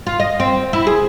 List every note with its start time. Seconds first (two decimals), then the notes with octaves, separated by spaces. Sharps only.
0.07 F4
0.20 D#5
0.40 C4
0.73 E4
0.87 G#4